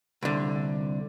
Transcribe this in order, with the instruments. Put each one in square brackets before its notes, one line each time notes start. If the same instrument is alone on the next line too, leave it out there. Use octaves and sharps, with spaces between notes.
[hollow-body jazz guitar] C2 D3